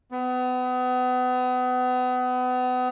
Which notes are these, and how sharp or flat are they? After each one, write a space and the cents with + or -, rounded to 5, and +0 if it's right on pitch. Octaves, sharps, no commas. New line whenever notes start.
B3 +35